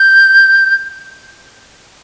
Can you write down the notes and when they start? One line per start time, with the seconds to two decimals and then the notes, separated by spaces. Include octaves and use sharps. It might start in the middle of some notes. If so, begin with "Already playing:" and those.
Already playing: G6